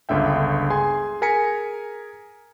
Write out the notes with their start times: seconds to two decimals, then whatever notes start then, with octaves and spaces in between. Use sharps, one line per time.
0.09 G1 C#2 D3 E5 G5
0.70 G#4 G#5 C6
1.22 G#4 A#4 G#5 A#5 B6 C#7